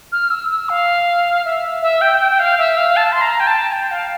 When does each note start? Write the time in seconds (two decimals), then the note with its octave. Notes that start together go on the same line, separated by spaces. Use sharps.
0.12 F6
0.31 E6
0.50 E6
0.69 F5
1.45 E5
1.82 E5
2.01 G5
2.20 G5
2.31 G5
2.39 F5
2.58 E5
2.77 F5
2.96 A5
3.12 C6
3.21 A#5
3.40 G5
3.47 A5
3.72 G5
3.91 F5